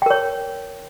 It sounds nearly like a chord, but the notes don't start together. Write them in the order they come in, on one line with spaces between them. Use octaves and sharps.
G5 A#4 C#5